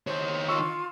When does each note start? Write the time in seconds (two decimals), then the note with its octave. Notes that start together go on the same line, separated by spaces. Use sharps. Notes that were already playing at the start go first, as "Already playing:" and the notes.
0.07 D#3 C5 C#5
0.49 F4 C#6 E6